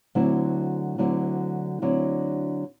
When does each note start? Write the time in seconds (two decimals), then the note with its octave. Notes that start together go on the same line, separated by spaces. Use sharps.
0.15 D2 D3 F#3 C4 E4
0.98 D2 D3 F#3 C4 E4
1.82 D2 D3 F#3 C4 E4